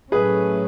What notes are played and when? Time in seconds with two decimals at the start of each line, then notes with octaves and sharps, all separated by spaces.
0.12 A2 F#3 A3 C#4 G#4 B4